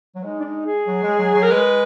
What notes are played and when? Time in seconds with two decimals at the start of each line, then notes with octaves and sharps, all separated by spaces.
0.15 F#3
0.24 G#3 D#4
0.40 D4
0.45 D#4
0.65 G#4
0.87 F#3
1.03 G#3
1.19 F#3
1.35 F#3
1.43 A#4
1.51 G#3 B4